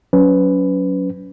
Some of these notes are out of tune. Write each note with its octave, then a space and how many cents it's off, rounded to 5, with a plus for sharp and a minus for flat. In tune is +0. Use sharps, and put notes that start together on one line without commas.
F#3 +0 C#4 +20 B4 +15